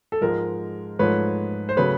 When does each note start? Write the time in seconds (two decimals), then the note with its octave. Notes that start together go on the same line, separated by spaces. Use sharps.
0.12 A4
0.21 G#2 F3 G#3 A#4
0.99 G#2 F3 A3 B4 C#5
1.69 C5
1.76 C#3 F#3 A3 B4 C#5